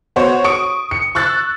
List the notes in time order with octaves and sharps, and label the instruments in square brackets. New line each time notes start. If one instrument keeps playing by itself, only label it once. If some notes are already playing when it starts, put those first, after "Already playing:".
[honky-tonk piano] B3 F#4 C5 C#5
C#6 D#6 D7
C#7
C#6 E6 F#6 A6